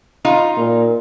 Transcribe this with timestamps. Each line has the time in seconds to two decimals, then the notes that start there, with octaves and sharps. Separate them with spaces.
0.25 D#4 F4
0.58 A#2